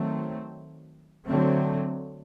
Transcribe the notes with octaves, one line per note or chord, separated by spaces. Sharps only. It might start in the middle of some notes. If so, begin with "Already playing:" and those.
Already playing: D#3 F#3 A3 C4
D3 F#3 A3 C4